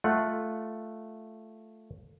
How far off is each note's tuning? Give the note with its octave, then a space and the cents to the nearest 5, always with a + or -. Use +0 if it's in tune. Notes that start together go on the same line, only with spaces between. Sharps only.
A3 +0 F4 +0 F#5 -5